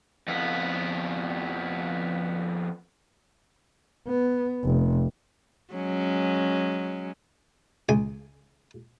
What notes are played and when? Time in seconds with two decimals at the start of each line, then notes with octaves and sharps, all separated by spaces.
0.28 F2 B3
4.08 B3
4.64 F1
5.74 F#3 G#3 C#4
7.89 C#2 G#5